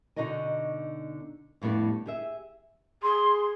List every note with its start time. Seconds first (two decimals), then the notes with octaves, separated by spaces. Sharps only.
0.16 B2 D3 D#4 F#4 D#5 G#5
1.62 F2 A2 G3 B3 D4
2.06 G4 G#4 E5
3.03 G#4 C6